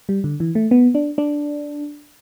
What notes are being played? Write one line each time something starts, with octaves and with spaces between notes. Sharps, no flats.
G3
D3
E3
A3
B3
D4
D4